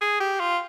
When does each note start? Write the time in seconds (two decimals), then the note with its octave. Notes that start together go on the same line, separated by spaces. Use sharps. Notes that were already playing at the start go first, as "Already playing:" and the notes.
0.01 G#4
0.20 G4
0.40 F4